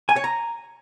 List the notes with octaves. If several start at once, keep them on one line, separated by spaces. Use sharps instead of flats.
G#5
C#5
A#5